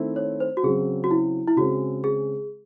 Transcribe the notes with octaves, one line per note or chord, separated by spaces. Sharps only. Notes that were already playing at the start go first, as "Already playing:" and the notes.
Already playing: D#3 A3 C4 E4
C#5
C5
F#4
C#3 F#3 C4 G#4
F#4
E4
E4
C#3 G#3 C4 F#4
G#4